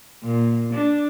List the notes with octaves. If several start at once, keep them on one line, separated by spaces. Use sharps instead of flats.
A#2
D4